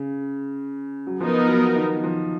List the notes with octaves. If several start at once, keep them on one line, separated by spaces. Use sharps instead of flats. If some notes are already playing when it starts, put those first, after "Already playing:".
Already playing: C#3
F#3
F3 B3 D#4 A#4
F#3
D#3
F3